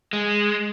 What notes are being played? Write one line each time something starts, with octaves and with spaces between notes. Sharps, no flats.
G#3